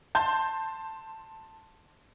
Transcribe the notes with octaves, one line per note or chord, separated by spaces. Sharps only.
A5 C6 G6